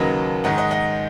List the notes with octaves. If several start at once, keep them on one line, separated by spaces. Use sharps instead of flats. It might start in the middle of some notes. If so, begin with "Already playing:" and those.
Already playing: D#2 C#3 F#3 A#3 B4 D#5
G#2 D#3 G#3 D#5 F#5
D#5 F#5
D#5 F#5